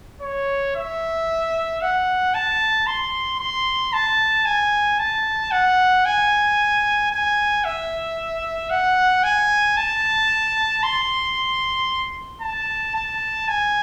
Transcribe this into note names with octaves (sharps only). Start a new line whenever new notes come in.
C#5
E5
F#5
A5
C6
C6
A5
G#5
A5
F#5
G#5
G#5
E5
F#5
G#5
A5
C6
A5
A5
G#5